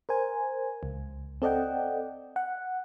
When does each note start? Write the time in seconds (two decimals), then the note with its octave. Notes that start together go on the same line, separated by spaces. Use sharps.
0.09 A#4 C5 G#5
0.83 C#2
1.42 C4 A4 D5 D#5 F#5 G5
2.36 F#5